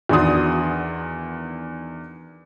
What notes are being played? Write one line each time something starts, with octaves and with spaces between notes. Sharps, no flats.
E2 D#3 D4 F#4 C6 D#6